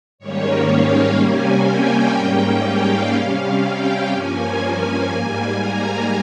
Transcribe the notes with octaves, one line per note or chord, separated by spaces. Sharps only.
G#2 D#3 G3 A#3 C#4 C#5
F5
C3 G3 A#3 C#4 G#5
G5
G#2 G3 A#3 C#4
F5
C3 G3 C#4
G5
G2 F3 A#3 C#4 G#5
G#2 G3 A#3
A#5